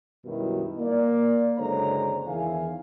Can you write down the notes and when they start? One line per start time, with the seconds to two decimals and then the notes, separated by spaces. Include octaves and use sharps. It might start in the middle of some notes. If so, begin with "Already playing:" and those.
0.25 F#2 B2 D#3 F#3 G3 E4
0.79 A#3 D5
1.57 F#1 D3 G#3 C5 C#5 A#5
2.26 E2 D#3 E4 G#4 F5 G#5